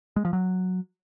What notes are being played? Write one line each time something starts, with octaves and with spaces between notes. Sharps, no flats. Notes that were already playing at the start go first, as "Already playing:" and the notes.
G#3
F3
F#3